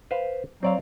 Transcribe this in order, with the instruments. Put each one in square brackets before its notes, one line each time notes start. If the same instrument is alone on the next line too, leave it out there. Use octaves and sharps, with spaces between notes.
[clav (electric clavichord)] B4 C5 F5
[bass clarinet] F#3 [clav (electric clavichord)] C4 D5 F5